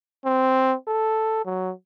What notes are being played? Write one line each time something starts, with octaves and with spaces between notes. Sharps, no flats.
C4
A4
F#3